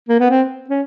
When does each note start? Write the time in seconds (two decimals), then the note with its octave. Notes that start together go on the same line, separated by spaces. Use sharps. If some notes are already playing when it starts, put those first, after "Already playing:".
0.09 A#3
0.20 B3
0.30 C4
0.70 C#4